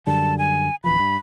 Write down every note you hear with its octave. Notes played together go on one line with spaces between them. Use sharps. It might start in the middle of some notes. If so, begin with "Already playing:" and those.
F#2 D3 G3 A5
G#5
D1 E3 F3 B5
G2